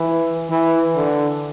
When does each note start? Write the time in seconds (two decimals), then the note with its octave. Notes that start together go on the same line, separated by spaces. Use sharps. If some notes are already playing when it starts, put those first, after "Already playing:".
Already playing: E3
0.51 E3
0.96 D3